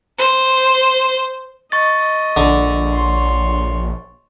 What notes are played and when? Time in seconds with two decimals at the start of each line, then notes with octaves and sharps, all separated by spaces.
0.18 C5
1.72 D#5 C#6 A6
2.37 A#1 D3
2.94 C#5 C6